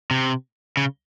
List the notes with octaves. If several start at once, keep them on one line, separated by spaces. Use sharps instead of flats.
C3
C#3